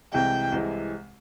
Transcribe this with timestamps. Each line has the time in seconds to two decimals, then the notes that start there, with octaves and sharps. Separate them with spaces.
0.12 C2 C3 E3 G#3 G5
0.52 C2 C3 E3 G#3